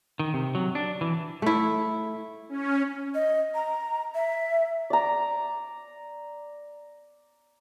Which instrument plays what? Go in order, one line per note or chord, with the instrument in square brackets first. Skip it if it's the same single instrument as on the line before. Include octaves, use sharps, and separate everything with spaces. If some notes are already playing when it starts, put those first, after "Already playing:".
[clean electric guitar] D#3
C3
F#3
D4
E3
[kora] A3 E4
[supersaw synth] C#4
[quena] D#5
A#5
E5
[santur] D5 A#5